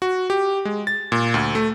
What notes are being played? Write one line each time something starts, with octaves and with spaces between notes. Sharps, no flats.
F#4
G4
G#3
A6
A#2
D2
A3